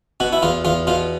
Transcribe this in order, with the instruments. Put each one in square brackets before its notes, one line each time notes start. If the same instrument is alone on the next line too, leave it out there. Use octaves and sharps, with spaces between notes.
[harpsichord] B2 F#4
E4
E2 F4
E2 F4
B2 F4